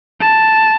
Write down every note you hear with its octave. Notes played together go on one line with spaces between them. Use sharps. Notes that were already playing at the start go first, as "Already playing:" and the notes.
A5